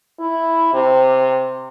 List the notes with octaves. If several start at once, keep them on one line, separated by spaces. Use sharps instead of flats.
E4
C3